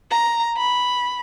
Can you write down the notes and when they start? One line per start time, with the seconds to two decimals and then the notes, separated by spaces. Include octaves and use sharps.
0.11 A#5
0.57 B5